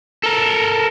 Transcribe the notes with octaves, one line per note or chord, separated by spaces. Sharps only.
A4 A#4